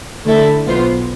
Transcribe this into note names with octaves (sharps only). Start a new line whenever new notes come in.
D3 A3 E4 A4 E5
B1 B2 B3 F4 C5